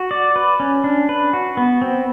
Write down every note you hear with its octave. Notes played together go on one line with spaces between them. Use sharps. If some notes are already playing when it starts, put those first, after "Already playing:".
Already playing: F#4
D5
B4
C#4
D4
B4
F#4
B3
C4